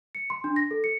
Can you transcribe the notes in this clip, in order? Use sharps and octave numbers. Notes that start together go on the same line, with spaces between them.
C#7
C6
D4
A#6
A4
C#7